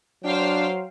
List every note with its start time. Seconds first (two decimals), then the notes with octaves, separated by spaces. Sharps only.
0.25 F#3 D4 C5 F5 G5